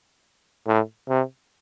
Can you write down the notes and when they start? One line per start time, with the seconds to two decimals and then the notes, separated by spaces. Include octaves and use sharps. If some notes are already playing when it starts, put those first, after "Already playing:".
0.67 A2
1.09 C3